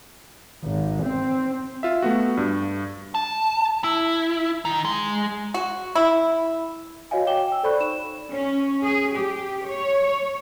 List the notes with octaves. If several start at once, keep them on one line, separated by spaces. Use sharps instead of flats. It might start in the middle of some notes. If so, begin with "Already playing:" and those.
G#1
C4
F4 E5
A3 B3 F#4
G2
A5
E4
D#3
G#3
F#4
E4
F#4 C#5 D#5 F5 G#5
C#5 G5 D6 E7 G7
G5 E6
A4 C5 D5 B5 C#6 F#6
D#4 E7
C#4
G#4
G4
C#5